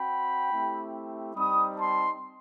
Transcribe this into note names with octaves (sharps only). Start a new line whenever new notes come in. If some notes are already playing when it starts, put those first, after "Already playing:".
Already playing: C4 F#4 G5 B5
A3 C4 E4 G4
G3 C4 D#4 B5 D#6
A5 C6